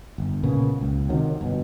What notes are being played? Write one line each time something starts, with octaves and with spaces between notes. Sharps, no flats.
G1
A#2 C#3 A#3 B3
C#2
C3 D#3 F#3
G1 B2